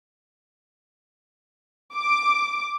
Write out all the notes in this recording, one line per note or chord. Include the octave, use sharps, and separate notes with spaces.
D6